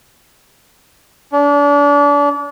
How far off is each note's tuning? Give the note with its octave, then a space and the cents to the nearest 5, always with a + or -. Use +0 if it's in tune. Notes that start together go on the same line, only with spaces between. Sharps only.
D4 -35